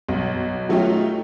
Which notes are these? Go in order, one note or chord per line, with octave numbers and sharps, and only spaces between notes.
B1
F#3 A3 C#4 D#4 F4 G4